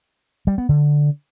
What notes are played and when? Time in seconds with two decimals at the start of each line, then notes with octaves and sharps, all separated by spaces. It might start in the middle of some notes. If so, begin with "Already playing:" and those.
0.47 G3
0.58 B3
0.69 D3